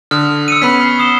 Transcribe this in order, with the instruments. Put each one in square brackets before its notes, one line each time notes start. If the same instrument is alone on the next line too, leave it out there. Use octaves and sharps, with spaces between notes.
[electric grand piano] D3 [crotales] D#6 [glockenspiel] F6
[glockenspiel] E6 C#7 D#7
[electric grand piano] B3 C#4 [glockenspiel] B5 B6 [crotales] D#6 E6
[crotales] F6 C7
[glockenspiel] D#6 [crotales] C7 E7 G7